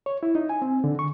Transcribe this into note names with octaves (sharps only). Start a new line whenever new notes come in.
C#5
E4
D#4
G#5
C4
D3
C#6